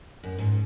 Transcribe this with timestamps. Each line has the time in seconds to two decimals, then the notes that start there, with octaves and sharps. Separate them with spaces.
0.23 F#2
0.38 G#2